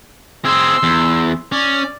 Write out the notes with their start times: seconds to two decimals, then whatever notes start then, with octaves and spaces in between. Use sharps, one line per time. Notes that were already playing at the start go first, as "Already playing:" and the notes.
0.45 C4 G#4 C6 E6
0.83 E2
1.52 C#4 D5